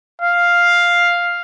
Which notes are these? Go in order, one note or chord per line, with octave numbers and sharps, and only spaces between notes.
F5